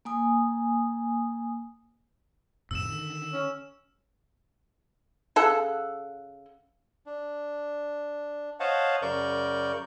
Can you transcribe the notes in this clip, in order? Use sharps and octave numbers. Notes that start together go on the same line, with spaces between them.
A#3 G#5 D#6
F2 A2 C3 E6 E7
D3 D#3
C#4
C#3 A4 F#5
D4
C5 C#5 D#5 F5 F#5 A5
F#2 C#3 A#4 D5 C#6 G6